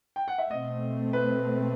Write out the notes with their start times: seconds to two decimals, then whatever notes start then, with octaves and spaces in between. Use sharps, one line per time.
0.16 G5
0.28 F#5
0.38 E5
0.49 B2 A3 C4 D#5
1.13 B4